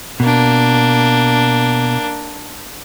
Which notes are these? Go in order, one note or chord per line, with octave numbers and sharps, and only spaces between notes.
B2 A#3 D4